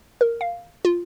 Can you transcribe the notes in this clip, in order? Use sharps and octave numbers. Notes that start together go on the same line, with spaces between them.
A#4
F5
F4